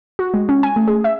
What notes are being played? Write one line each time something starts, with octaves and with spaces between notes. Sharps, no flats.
F#4
G#3
C#4
G#5
A3
G#4
E5